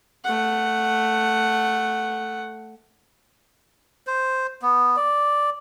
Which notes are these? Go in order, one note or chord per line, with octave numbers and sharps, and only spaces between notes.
A3 F#5
C5
B3
D5